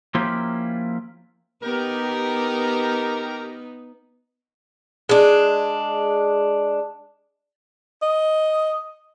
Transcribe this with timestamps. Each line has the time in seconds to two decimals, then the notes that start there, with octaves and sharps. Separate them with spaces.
0.15 F3 A#3 C#4 E4 F4 G4
1.63 B3 D#4 G4 A#4
5.09 G#3 D4
8.02 D#5